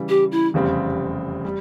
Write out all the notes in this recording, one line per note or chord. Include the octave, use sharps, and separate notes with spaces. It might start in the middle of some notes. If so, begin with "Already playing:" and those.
Already playing: C#3 E3 G3
G4
E4
F1 E2 C#3 G3 C4
G3